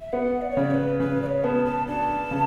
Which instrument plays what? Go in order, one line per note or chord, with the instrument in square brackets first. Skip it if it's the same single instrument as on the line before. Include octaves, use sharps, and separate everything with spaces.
[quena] E5
[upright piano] B3 [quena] F#5
[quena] D5
C#5
[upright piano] C#3 [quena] D5
[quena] C#5
B4
[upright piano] C#3 [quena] B4
[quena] D5
C#5
[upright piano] B3 [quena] A5
[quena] A5
[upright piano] D4 [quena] A5
[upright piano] C#3